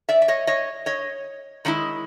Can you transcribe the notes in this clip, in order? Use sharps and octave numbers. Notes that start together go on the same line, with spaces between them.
D5 E5
E5
C#5 D#5
C#5 D#5
C#5 D#5
D#3 G#3 C#4 E4